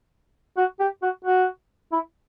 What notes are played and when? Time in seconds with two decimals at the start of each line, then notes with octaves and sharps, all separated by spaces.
0.57 F#4
0.79 G4
1.02 F#4
1.24 F#4
1.92 E4